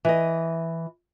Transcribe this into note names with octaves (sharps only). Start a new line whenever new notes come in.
E3 D#5